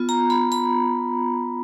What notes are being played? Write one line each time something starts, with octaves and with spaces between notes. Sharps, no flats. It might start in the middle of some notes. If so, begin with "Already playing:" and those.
Already playing: B3 F4
A#5
B5
B5